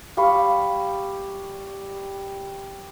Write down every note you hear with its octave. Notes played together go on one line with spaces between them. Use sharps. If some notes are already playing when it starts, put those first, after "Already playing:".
G3 F5 B5 C#6